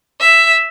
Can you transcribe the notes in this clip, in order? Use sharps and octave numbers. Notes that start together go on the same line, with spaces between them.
E5